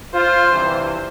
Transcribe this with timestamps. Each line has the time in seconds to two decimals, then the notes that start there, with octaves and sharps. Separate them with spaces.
0.14 F4 C5
0.52 G2 C3 E3